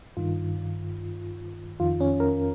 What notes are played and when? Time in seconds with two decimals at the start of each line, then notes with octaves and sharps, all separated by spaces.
0.17 G2 D#3 F4
1.80 F2 D#3 F4
2.00 C#4
2.20 A#4